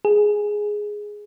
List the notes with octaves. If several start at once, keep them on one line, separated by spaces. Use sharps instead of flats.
G#4